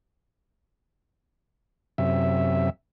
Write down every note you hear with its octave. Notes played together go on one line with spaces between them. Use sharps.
F#2 C3 E5